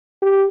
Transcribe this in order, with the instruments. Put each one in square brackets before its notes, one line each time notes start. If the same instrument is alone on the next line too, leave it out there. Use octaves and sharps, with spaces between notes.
[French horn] G4